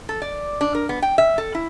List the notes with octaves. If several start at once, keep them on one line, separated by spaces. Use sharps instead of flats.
A4
D5
D4
A#4
B3
G5
E5
A4
E4